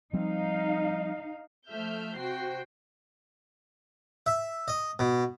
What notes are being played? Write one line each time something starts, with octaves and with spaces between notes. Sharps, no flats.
F3 G3 C4 D#4 F5
F3 A3 E5 F6 G6
C3 F#4 C5 G5 C7
E5
D#5
B2